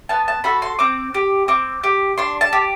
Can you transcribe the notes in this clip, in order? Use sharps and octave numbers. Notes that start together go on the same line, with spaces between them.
B3 A5
A5
F#4 A4 B5
C6
C4 D6
G4
C4 D6
G4
D4 C6
A5
G4